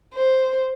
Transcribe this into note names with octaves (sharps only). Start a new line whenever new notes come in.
C5